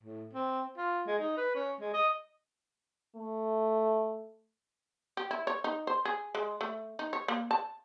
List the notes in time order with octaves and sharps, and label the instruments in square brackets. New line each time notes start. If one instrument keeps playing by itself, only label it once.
[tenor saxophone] A2
C4
F4
G#3
D#4
B4
C#4
G#3
D#5
[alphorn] A3
[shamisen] G4
E4
C#5
D#4
C5
G#4
G#3
A3
D#4
C#5
A#3
A5